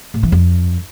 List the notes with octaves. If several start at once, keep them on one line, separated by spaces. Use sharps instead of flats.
A2
E3
F2